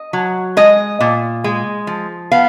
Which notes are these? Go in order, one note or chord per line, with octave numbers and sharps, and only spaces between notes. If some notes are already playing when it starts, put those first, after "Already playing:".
Already playing: D#5
F#3
G#3 D#5
A#2
G#3
F3
B3 F5